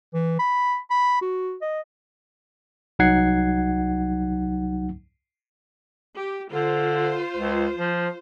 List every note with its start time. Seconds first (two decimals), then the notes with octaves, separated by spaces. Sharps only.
0.14 E3
0.39 B5
0.91 B5
1.22 F#4
1.62 D#5
2.99 C2 F#3 D#4 F#5 G#6 C7
6.17 G4
6.53 D3 F4 C5
7.37 C#2
7.77 F3